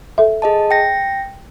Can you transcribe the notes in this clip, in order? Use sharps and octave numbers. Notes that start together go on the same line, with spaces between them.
A4 E5
G#4 D#5 A5
G5 A#6